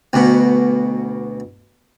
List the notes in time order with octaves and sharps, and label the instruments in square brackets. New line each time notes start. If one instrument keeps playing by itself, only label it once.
[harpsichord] D2 B2